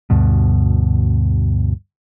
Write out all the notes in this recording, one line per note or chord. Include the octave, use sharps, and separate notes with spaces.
D2 G2 B2